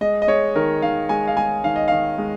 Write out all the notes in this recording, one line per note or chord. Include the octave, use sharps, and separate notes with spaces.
G#3 D#5
D#5
G#3 C#5
D#3 A#4
D#3 F5
G#3 G#5
F5
G#3 G#5
D#3 F5
D#5
D#3 F5
G#3